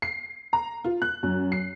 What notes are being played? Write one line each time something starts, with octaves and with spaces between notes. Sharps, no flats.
C7
A#5
F4
F#6
F#2
C7